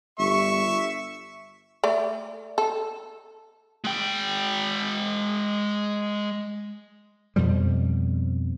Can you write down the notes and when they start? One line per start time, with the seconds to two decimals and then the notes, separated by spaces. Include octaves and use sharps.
0.19 G1 E5 C#6
1.84 A3 D5
2.58 A4
3.84 G#3 G5
7.36 F2 B2 F3 G3